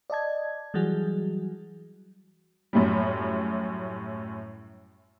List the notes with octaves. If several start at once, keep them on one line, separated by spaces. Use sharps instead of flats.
D5 D#5 A5 G#6
E3 F#3 G3 F#4 G#4
F#2 A2 G3